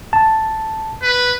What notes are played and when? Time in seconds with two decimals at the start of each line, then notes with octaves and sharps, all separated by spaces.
0.13 A5
1.03 B4